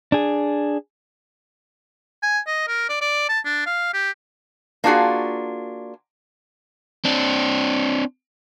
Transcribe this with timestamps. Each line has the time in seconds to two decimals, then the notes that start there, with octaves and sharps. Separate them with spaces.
0.12 D4 G#4
2.22 G#5
2.47 D#5
2.68 A#4
2.89 D5
3.01 D5
3.29 A5
3.45 D4
3.66 F5
3.94 G4
4.84 A#3 D4 F4 F#4 G#4
7.05 C4 D4